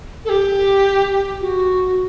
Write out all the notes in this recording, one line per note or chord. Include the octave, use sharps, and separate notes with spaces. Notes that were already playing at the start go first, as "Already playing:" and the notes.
A4
G4
F#4